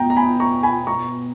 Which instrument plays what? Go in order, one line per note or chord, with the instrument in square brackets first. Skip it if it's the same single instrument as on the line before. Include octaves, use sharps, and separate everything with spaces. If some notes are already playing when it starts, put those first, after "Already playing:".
Already playing: [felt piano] B2 B3 [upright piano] G5 A#5
[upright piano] A#5
G#5 B5
A#5 C#6
G#5 B5
A#5 C#6